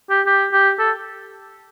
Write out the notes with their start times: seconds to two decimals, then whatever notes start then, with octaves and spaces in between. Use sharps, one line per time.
0.10 G4
0.27 G4
0.53 G4
0.79 A4